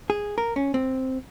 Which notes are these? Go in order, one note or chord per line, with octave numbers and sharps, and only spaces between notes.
G#4
A#4
C#4
C4